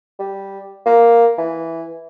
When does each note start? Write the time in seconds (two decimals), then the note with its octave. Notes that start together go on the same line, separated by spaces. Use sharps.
0.20 G3
0.86 A#3
1.38 E3